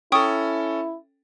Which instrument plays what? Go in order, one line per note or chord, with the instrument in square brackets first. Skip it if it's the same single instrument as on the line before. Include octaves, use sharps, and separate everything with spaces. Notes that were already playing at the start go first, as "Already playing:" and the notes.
[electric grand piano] C#4 A4 [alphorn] E4 [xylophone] G5 C#6 D#6